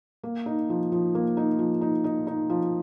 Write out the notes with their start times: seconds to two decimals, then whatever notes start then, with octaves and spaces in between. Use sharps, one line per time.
0.23 A#3
0.46 D#4
0.70 F3
0.92 F3
1.15 A#3
1.37 D#4
1.59 F3
1.81 D#4
2.04 D#4
2.27 D#4
2.50 F3